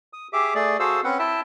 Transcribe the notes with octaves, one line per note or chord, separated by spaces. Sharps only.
D#6
G4 G#4 E5 D6
A3 G#4 D5
F#4 G#4 A4 C5 F5 E6
C4 C#4 B4 F#5
E4 E5 G5 A5